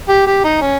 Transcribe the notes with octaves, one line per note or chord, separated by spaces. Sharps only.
G4
G4
D#4
C#4